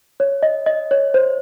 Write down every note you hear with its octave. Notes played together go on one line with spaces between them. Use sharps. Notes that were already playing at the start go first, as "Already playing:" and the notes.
C#5
D#5
D#5
C#5
C5